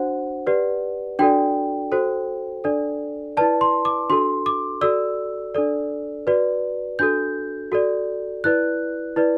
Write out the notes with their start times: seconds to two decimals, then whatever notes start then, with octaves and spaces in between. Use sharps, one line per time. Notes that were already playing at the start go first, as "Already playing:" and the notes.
Already playing: D4 F#4 C5 F#5
0.47 G4 B4 D5
1.19 D4 F#4 A4 D5 G5
1.92 F#4 A4 C5
2.64 D4 A4 D5
3.37 E4 B4 D5 A5
3.61 C6
3.85 D6
4.09 D4 F#4 A4 C6
4.46 D6
4.81 F#4 A4 D5 E6
5.54 D4 A4 D5
6.27 F#4 B4 D5
6.99 D4 F#4 A4 G6
7.72 F#4 A4 D5
8.44 E4 B4 D5 F#6
9.16 E4 B4 D5